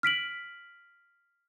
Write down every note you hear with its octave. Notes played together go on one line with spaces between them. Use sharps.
F6 B6 D7 F#7